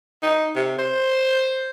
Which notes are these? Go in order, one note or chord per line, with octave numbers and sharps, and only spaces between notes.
D#4
C3
C5